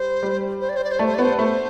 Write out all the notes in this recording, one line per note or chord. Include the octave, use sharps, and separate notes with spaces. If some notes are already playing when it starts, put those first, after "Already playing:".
Already playing: G3 C5
G3
C5
D5
C5
D5
C5
A3 D5
C5
D5
B3 C5
A3 C5